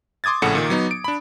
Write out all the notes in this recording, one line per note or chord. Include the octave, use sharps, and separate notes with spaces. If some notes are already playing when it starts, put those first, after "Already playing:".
C6 D6 D#6 G#6 A6
A#1 A2 C#3 A4 F#5 C#7
A#2 D#3
F#3 B3 D#4
D7
D4 B5